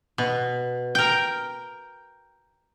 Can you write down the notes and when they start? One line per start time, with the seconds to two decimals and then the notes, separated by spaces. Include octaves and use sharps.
0.18 B2
0.95 A#4 G5